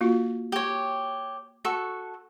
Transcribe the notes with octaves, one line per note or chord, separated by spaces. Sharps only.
A#3 F4 F#4
G4 C#5
F#4 A4 C#6